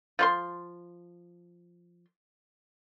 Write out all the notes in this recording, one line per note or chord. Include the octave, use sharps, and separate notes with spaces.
F3 B4 C6